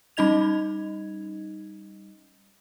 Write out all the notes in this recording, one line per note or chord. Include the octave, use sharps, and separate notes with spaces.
G3 C#4 D#4 D#5 G#6 F7